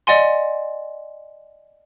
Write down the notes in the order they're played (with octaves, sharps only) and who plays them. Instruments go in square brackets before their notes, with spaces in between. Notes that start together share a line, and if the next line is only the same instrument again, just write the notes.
[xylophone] D5 D#5 F#5 G#5 C6